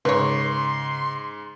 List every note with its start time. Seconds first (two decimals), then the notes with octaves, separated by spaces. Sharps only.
0.05 G#2 C#3 B4 C#5 C6